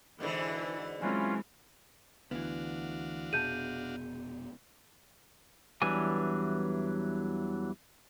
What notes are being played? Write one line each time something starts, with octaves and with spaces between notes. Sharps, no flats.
G#2 B2 D3 E3
E3 F#3 G#3 C4 C#4 F4
D2 D3 E3 B3 D4 F#4 F5
F1 B2 B3 G#4 E5 A5 G6 D#7
E2 E3 F#3 G3 D4 G#5